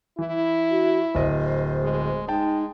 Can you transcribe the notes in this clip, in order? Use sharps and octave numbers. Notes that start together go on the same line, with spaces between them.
E3 E4
F#4
D1 C5 D#5
G#3
G#3 D#4 G5 A5